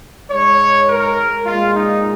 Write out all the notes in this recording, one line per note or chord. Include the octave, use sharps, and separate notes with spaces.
G#2 G#3 C#5
A#4
A#2 G#3 F4
D#4